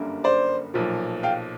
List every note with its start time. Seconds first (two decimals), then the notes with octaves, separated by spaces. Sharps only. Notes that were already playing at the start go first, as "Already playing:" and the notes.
Already playing: G1 F#2 D3 G3 A#3
0.24 C5 D5
0.74 B1 A#2 F3
1.23 F5 G5